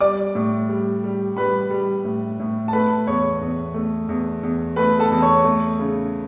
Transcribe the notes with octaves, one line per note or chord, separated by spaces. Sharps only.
G3 D5 D6
A2
G3
G3
G3 B4 B5
G3
A2
A2
A5
A3 B4 B5
E2 C#5 C#6
E2
A3
E2
E2
A3 B4 B5
A4 A5
E2
C#5 C#6
A3
C#3